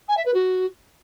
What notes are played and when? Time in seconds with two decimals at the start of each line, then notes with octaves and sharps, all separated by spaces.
0.08 G#5
0.17 E5
0.25 B4
0.34 F#4